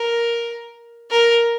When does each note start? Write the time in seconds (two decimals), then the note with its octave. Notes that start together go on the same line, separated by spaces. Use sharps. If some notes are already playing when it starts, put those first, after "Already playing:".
Already playing: A#4
1.11 A#4